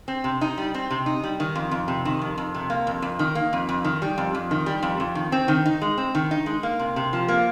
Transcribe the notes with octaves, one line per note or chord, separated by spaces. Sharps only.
C4
C3
D#4
G3
C4
C3
D#4
G3
D#3
F2
F2
C3
D#3
F2
F2
C3
A#3
F2
F2
D#3
A#3
F2
F2
D#3
G3
F2
F2
D#3
G3
F2
F2
D#3
C4
D#3
D#4
G#3
C4
D#3
D#4
G#3
A#3
C3
C3
F3
A#3